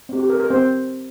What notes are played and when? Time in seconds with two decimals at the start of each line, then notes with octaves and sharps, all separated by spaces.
0.09 C4 G4
0.19 G4
0.29 A#4
0.40 A#4
0.50 C4 C5